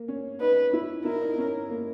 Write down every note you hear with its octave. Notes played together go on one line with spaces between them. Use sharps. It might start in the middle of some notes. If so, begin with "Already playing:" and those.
Already playing: A#3
C#4
D#4 B4
E4
E4 A#4
D#4
C#4
A#3